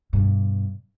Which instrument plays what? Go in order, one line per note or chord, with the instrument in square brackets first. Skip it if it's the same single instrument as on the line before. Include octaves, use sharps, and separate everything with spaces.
[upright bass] G2 B2